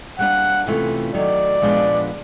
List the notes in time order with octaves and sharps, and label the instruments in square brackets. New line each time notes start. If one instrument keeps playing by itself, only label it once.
[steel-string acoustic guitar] G3 A#3 D4 [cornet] F#5
[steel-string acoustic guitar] C3 E3 A3 C#4 F4
[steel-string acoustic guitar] D#3 F#3 A3 [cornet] D5
[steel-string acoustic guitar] A#2 F3 G#3 B3 D4